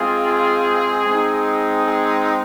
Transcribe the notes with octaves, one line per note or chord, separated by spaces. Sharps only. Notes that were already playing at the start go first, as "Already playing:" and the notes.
Already playing: G#3 C4 F4 G#4
G#3 C4 D#4
G#4